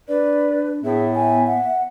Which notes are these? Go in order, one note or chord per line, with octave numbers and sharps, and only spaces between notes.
D4 B4 D5
A2 B3 G#4 E5
E5 G#5
F#5